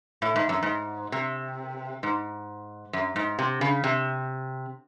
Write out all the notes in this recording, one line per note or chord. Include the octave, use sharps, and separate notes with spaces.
A2
G#2
F#2
G#2
C3
G#2
F#2
G#2
C3
C#3
C3